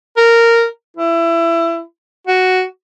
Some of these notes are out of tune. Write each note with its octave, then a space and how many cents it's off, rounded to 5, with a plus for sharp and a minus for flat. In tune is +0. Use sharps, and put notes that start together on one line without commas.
A#4 -10
E4 +25
F#4 +0